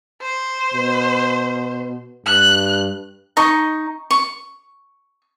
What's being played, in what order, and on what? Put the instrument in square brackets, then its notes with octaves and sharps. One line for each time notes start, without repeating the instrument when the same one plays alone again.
[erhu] C5
[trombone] B2
[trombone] G2 [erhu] F#6
[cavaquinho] D#4 C#6
C#6